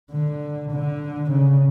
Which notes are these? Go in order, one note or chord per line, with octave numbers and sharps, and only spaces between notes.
D3
D3
C#3